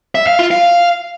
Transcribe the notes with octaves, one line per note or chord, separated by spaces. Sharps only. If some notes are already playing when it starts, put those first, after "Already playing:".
E5
F5
F4
F5